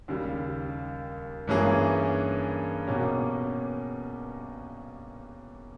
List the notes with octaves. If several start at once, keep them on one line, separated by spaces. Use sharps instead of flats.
D#2 C#3 G3
G2 E3 A#3 C#4 G#4
B2 A#3 C#4 G4